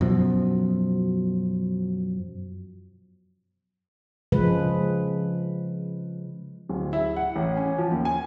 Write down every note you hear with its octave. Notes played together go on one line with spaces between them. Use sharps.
F#2 B2 F3
C#3 F3 G#3 B4
D1
E4
F#5
A1
C#4
F3
D#2
G#5